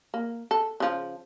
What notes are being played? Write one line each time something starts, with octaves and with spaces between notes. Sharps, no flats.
A#3
A4
C#3 F3